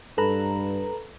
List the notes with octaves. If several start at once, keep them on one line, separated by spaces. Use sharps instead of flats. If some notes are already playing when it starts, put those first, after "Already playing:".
G2 A4 B4 A#5